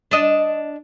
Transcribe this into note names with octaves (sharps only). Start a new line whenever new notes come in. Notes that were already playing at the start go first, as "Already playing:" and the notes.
D4 D#5